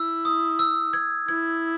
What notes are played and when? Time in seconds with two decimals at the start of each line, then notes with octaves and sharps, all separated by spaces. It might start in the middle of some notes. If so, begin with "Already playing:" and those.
Already playing: E4 E6
0.25 D#6
0.59 E6
0.93 G#6
1.28 E4 G#6